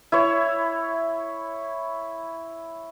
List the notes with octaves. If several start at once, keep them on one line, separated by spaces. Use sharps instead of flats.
E4 C#5